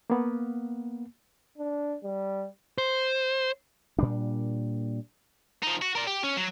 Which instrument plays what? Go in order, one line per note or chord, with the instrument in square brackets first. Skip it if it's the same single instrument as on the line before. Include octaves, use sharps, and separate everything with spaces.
[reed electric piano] A#3 B3
[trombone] D4
G3
[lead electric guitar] C5
[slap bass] A#2 G3 D4
[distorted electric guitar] F3 D#4
F#4
A#4 D5
G4
C#4
F#3